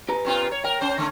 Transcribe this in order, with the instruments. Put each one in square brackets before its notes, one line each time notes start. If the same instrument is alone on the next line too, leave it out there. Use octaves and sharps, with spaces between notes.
[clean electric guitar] G4 B4 A#5
[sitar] A#2 C4 F4
C#5
[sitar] A#4 [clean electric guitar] G5
[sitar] C#4 C5
D3 A3 C#4